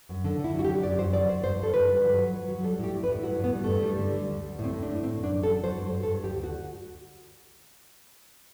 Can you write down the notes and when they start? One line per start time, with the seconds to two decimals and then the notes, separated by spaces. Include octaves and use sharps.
0.09 F#2
0.24 D3
0.39 D3 E4
0.54 F#3
0.59 F#4
0.64 G4
0.69 F#3
0.83 F#2 D5
0.99 F#2 C5
1.13 F#3 D5
1.29 F#2 C5
1.44 G2 C5
1.59 G2 A4
1.73 D3 B4
1.89 G2
2.04 F#3
2.18 F#3
2.34 F#3
2.48 F#3
2.63 G3 A4
2.79 A2 G4
2.93 A2
3.04 B4
3.09 A2
3.23 G2 F#4
3.39 G2
3.44 B3
3.53 G3
3.64 A3
3.69 G2
3.83 G3
3.98 D3
4.14 G3
4.29 D2
4.44 G3
4.59 A2 C4
4.74 A2
4.83 D4
4.89 A2
5.03 D3 C4
5.18 F#2
5.24 D4
5.34 F#2
5.43 A4
5.48 F#3
5.64 F#3 C5
5.78 G2
5.93 G2
6.03 A4
6.08 G2
6.23 D2 G4
6.38 D2
6.44 F#4